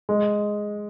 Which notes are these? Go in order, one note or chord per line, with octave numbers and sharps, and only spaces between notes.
G#3